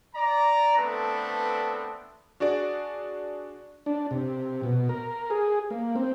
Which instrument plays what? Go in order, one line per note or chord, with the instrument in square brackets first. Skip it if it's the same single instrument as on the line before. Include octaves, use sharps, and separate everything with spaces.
[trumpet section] D5 A#5
A3 B3 C4 D4 A4 B4
[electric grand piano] D4 F#4 G#4 D5
[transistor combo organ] D4
C3
B2
A#4
G#4
A#3
C4